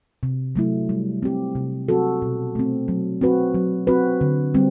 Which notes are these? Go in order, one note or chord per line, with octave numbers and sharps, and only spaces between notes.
C3
F#3 A3 E4
G3
C4 G4
C3
F#3 C4 F#4 A4
B2
A3 C4
F#3
C4 F#4 B4
F#3
C4 F#4 B4
D3
G3 C4